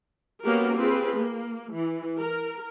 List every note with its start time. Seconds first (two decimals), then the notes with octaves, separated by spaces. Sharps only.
0.44 A#3 B3 C#4 F#4 G4 A#4
0.78 C4 F4 G4 G#4 B4
1.20 A#3
1.73 E3
2.19 A#4